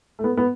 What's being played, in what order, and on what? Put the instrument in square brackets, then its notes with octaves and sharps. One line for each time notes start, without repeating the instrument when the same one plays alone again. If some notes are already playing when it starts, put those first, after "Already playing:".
[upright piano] A3
B3
B3